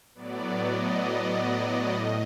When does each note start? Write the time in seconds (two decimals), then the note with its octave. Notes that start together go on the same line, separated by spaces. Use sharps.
0.15 A2 F#3 B3 D5
0.59 D#5
1.94 A2